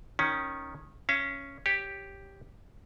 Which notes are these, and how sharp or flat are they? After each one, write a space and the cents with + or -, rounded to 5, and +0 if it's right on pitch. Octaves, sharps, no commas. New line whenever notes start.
D#3 +0 C#4 +0
C#4 +0 F5 -45
G4 +0 C#5 +0